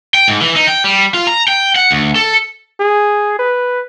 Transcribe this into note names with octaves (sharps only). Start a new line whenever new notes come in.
G5
G#2
E3
D#4
G5
G3
F4
A#5
G5
F#5
D2
A4
G#4
B4